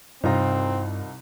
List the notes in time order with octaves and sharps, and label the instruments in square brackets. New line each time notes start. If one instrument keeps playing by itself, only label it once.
[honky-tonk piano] C2 [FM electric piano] G2 [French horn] C4 [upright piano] D#4 F4 A#5